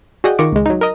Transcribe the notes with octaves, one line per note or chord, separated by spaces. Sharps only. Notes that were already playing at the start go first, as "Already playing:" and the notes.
F#4 G#4 D5 D#5 F#5 G5
D#3 F4 A#5 C#6 D6 D7
C#2 G#3
F#3 D#4
A#4 D#5